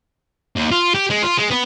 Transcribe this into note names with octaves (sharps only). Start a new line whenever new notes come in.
D#2
F4
G4
G#3
F4
G#3
B3